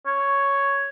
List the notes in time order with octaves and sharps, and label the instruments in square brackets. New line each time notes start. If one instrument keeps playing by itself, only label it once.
[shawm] C#5